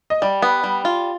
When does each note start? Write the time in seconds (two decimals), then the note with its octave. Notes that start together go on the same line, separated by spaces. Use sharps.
0.10 D#5
0.22 G3 D5
0.42 B3
0.64 G3
0.85 F4